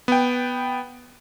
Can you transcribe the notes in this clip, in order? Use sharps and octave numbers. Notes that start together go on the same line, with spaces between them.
B3 G5